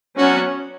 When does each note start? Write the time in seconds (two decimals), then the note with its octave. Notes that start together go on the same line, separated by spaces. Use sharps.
0.17 F#3 B3 C#4 D4 F#4